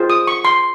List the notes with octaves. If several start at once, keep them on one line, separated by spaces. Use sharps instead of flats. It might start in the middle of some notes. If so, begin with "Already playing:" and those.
Already playing: F4 G#4 C5
D#6
C#6
C6